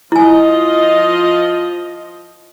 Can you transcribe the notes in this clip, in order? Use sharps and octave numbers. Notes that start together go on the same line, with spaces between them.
F3 E4 F4 D#5 G#5